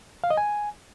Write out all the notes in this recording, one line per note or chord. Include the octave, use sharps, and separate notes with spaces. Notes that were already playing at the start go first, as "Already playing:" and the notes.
F5
D#5
G#5